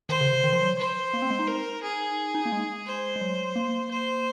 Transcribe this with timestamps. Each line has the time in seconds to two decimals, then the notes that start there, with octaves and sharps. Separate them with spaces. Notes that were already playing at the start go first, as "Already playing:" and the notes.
0.09 D#3 C5
0.21 C#3
0.32 C3
0.44 D#3
0.53 F3
0.61 F#3
0.78 C5
1.13 A#3
1.22 C4
1.30 G#3
1.39 D#4
1.48 A#4
1.83 G#4
2.35 D#4
2.46 A#3
2.52 G#3
2.87 C5
3.16 G#3
3.21 F#3
3.56 A#3
3.91 C5